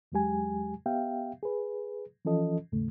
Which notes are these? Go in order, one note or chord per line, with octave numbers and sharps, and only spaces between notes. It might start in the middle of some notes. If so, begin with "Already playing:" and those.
E2 F#3 G#3 G4 G#5
B3 G4 E5 F5 G5
G#4 B4
E3 F3 C#4 F4 A4 D#5
D#2 G#2 C#3 A3